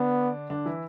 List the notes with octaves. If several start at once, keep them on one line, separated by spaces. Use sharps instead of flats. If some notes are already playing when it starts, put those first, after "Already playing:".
Already playing: D3 B3 D4
D3 D4
E3 E4